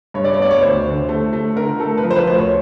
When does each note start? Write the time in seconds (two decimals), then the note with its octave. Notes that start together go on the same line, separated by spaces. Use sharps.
0.14 G2 C#5
0.24 D5
0.34 C#5
0.39 B3 D5
0.51 C#5
0.62 D2 C5
0.86 D3
1.09 A3
1.33 A3
1.56 D3 A#4
1.80 A3 A4
1.98 B4
2.03 F3 A#4
2.11 C5
2.16 B4
2.27 D2 C5
2.39 C#5